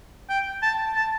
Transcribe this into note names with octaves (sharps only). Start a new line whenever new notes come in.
G5
A5
A5